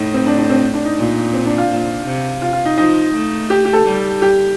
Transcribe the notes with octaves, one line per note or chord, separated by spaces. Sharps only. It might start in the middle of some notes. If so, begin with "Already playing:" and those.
Already playing: A2 D#4
C4
D4
D4
C4
D4
D#4
A#2
C4
D4
F4
A#2
C3
F4
F4
D#4
F3 D#4
A3
G4
G4
A4
G3
G4